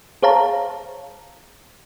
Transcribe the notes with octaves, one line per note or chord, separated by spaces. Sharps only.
G#4 C5 C#5 F5 A5 A#5